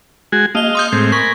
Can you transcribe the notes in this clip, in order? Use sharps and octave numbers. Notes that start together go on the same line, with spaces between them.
G#3 F#4 G#5
A#3 D#5 F5 G7
C6 D#6 G6
A2 G#3 C4
A#4 G#5 B5 C#6